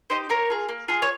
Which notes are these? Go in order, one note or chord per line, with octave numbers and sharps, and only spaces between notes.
D#4 G4 C5 D#5
A#3 A#4 C#5
F4 G#4
A#3
F4 G#4
C#5